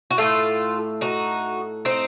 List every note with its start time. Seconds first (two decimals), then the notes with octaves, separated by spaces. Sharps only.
0.11 F#4
0.18 A2 A3 F4 A4
1.01 D#4 F#4
1.85 C4 D#4